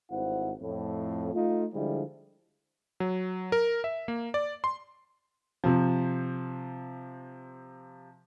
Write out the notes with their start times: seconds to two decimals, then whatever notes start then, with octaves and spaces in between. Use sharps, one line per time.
0.11 G#1 G2 E4 C5 F#5
0.62 F2 A2
1.34 A3 D#4 F4
1.74 D3 F3 G3 G#3 E4
3.00 F#3
3.52 A#4
3.84 E5
4.08 A#3
4.34 D5
4.64 C6
5.64 C3 F3